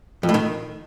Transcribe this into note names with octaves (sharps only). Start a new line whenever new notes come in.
F2
A2
D#3